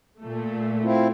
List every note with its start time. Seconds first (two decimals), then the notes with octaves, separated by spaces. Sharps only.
0.21 A#2 A3
0.82 C4 E4 F4